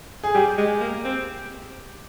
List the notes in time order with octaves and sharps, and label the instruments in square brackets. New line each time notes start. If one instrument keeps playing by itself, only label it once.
[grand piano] G#4
[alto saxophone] G3 [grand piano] G4
[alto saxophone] G#3
A#3
C4